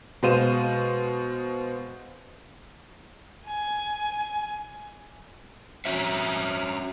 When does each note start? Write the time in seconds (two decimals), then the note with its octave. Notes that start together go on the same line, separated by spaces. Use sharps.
0.23 B2 G#3 C5 F5 D#7 E7
3.47 G#5
5.85 C#4 F#4 C#5 E5